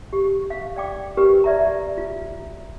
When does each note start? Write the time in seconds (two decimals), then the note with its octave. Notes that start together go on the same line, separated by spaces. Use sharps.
0.13 G4
0.50 F5
0.76 D5 G5 D6
1.17 G4 A#4 B4
1.44 D5 E5 A#5
1.98 F4